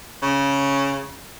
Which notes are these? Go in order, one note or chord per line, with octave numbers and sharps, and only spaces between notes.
C#3